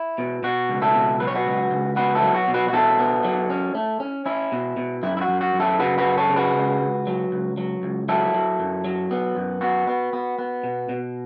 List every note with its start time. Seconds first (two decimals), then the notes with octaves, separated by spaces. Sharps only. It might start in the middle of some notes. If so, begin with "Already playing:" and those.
Already playing: E4
0.18 B2
0.43 B2 F#4
0.69 C#2
0.82 E4 A4
0.95 B2
1.20 F#3 B4
1.27 C#5
1.35 F#4 B4
1.45 C#2
1.71 C#2
1.96 B3 F#4 B4
2.15 E4 A4
2.22 F#3
2.34 F#4
2.48 B2
2.54 F#4 B4
2.68 F#4
2.73 B2 E4 A4
2.99 B3
3.24 F#3
3.50 C#4
3.75 A3
4.00 C#4
4.26 C#4 E4
4.52 B2
4.77 B2
5.03 F#2 E4
5.17 E4
5.21 F#4
5.29 F#2
5.41 F#4
5.54 F#2
5.60 E4 A4
5.79 C#3 F#4 B4
5.98 F#4 B4
6.04 F#2
6.17 A4 C#5
6.30 C#3
6.36 F#4 B4
6.55 C#2
6.81 C#2
7.07 F#3
7.32 C#2
7.57 F#3
7.83 C#2
8.08 F#3 E4 A4
8.34 F#3
8.60 F#2
8.85 F#3
9.11 B3
9.37 F#2
9.61 B3 F#4
9.87 B3
10.13 B3
10.39 B3
10.64 B2
10.89 B2